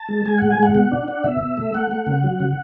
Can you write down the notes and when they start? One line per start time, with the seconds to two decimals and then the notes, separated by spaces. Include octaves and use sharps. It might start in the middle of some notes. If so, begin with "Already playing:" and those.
Already playing: A5
0.09 G#3
0.26 G#3 G#5
0.38 A2 F#5
0.50 G#5
0.58 G#3 F#5
0.74 B2 F#5
0.92 D4
1.08 D4
1.24 B2 E5
1.41 B2
1.57 A3
1.74 A3 F#5
1.91 A3
2.07 C#3
2.24 F#3
2.40 C#3